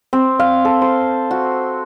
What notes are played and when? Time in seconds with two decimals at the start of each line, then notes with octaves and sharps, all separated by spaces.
0.13 C4
0.39 F5
0.65 A4
0.82 C5
1.31 F#4